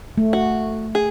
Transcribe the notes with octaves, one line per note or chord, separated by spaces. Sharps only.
A3
F#4
G#4